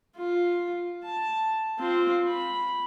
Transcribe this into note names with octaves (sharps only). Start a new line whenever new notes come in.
F4
A5
C4 F4
B5